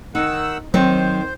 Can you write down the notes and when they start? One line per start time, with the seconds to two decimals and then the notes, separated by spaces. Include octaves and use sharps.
0.15 D#3 D#4 F#5 E6
0.74 D#3 F#3 C4 C5